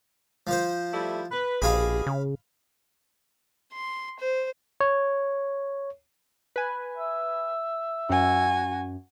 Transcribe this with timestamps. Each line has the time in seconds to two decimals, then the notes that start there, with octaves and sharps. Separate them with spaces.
0.47 F3 C5
0.94 G3 A3 E4
1.32 B4
1.62 A#1 B2 G4 G#4 F5 B5
2.06 C#3
3.73 C6
4.19 C5
4.81 C#5
6.56 B4 G#5
6.97 E5
8.10 F#2 F#4 G#5